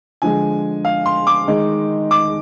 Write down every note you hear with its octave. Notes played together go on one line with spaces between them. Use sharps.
D3 F3 G#3 G#5
F5
C6
D6
D#3 G#3 D#4
D6